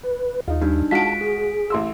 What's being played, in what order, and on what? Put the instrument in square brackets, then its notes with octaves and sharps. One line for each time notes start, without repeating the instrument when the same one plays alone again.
[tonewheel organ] B4
[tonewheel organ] D#2 [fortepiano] D#4 F4
[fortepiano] G2 [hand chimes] D4 D#4
[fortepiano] G#3 F4 F#4 [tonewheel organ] A5 [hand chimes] B6 D7
[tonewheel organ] G#4
[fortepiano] A1 C6 E6